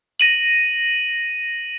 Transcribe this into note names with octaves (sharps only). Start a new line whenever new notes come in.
A#6 D#7 F#7